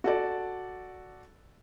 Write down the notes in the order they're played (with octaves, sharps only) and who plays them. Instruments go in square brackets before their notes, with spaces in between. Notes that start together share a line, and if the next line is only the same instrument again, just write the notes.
[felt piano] F#4 A4 D5